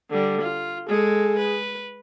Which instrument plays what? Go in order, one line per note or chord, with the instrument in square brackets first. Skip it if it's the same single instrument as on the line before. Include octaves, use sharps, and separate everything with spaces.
[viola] D3 G3
F4
[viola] G#3 A4 [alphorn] G#4
[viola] B4